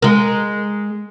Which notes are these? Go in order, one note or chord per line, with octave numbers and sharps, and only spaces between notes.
G#3 A#4